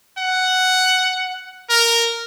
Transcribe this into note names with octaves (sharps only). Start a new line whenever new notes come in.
F#5
A#4